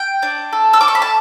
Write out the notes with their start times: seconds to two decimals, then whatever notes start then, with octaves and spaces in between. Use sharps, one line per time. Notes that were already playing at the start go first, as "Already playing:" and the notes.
Already playing: G5
0.22 D4
0.53 A4
0.73 E6
0.81 A4 D6
0.88 C#6
0.95 B5
1.02 A5